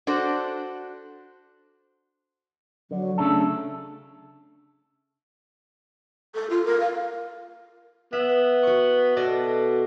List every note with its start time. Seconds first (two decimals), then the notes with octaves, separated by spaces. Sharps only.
0.07 D4 F#4 A4 C5
2.91 D3 F#3
3.18 C#3 A3 D4 A4
6.35 A4
6.50 F4
6.65 A#4
6.80 F5
8.13 B3 E5
8.63 F#4 C#6
9.16 B2 A4 D5 D#5